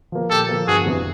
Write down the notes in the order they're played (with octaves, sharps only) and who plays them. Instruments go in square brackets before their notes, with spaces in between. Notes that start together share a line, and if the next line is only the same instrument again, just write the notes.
[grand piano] F3 A#3
[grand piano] A#2 [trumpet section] G4 A4
[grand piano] F3 A#3
[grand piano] G1 [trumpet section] F#4 G#4
[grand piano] F2 C3 E3